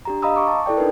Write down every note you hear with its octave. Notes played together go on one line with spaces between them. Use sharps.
D4 G4 A#5
D#5 F5 A#5 B5 D#6 E6
C#6 D6
A5
E4 A4 D5 G5
D4 D#4 A#4 B4